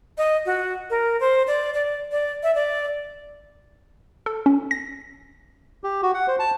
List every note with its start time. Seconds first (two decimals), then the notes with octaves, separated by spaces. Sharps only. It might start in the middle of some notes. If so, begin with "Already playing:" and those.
0.18 D#5
0.46 F#4
0.90 A#4
1.20 C5
1.47 D5
1.74 D5
2.12 D5
2.43 E5
2.55 D5
4.26 A4
4.46 C#4
4.71 A#6
5.84 G4
6.03 F#4
6.14 F#5
6.28 C5
6.39 A5